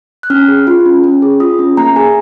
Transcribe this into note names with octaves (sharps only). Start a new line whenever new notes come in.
F#6
C#4 F6
G#4
F4
C#4
C#4
G#4
F4 D#6
C#4
A#3 A#5
G#4 G#5